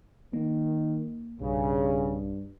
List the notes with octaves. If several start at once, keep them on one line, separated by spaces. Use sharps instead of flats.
D#3 A#3
B1 G2 C#3